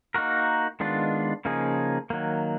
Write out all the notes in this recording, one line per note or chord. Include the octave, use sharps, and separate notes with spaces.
A#3 D#4 F#4 A#4
D#3 G#3 B3 D4 F4
C#3 F3 A#3 D#4 G#4
D#3 F#3 A#3